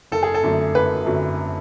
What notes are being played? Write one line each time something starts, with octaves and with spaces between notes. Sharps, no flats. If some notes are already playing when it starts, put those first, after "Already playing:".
F#1 A4
G#4
A4
F#2 D3 F#3 A3
F#1 B4
F#2 D3 F#3 A3